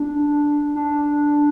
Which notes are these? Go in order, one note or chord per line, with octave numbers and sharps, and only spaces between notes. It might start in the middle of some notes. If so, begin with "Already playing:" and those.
Already playing: D4
D4